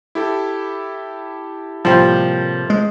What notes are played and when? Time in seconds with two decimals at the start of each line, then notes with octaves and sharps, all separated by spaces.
0.15 E4 G4 A4
1.85 A2 C3 F3 G3 A#3
2.70 G#3